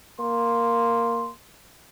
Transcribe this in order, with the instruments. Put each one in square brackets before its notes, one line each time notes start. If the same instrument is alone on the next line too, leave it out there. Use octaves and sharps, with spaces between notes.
[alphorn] A#3 [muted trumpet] C6